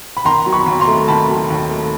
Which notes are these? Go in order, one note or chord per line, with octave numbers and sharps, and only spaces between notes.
B5
D#3 A#5 C6
F#3
B5 C#6
D#2
A#5 C6
A3
D#3 A5 B5
F#3
D#2
A3